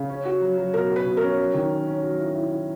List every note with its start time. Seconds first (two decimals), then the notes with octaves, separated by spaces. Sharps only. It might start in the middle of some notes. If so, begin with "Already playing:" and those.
Already playing: C#3
0.10 C#4
0.25 F#4
0.41 F#3
0.58 F#3
0.74 B2 A#4
0.90 F#4
0.96 B4
1.06 B2
1.17 A#4
1.23 C#4
1.38 F#3
1.54 D#3
1.71 C#4
1.87 C#4
2.03 F#3
2.19 E4
2.35 E4
2.51 E4